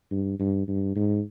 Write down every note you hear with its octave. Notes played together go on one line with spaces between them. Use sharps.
G2
G2
G2
G#2